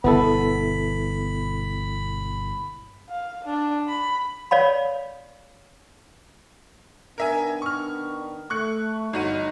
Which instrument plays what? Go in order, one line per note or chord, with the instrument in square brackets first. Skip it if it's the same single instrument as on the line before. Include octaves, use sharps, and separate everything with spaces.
[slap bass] G1 B2 [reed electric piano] B3 E4 A4 [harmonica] B5
[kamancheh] F5
D4
B5
[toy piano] C#5 D5 F5 B5
[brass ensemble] D#3 B3 D4 [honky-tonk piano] A#4 E5 G#5
[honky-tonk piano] C#6 F6
[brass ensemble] A3 [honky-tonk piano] C#6 F#6 C#7
[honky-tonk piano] G1 F#4 D#7 [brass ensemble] E2 F#3 D#4